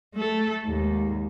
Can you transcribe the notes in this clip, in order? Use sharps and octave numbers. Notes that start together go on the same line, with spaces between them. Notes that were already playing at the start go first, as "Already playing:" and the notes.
A3 A4
D#2 G#2